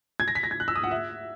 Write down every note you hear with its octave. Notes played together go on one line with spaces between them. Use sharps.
G#6
A#6
B6
A#6
G#6
F#6
E6
D#6
F#5
E5